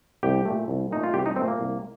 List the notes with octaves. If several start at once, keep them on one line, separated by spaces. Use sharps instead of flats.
C2 G4
A#2 A3
C2
A#2 A3 D#4
F4
C2 G4
D#4
A#2 A3 C4
A#3
C2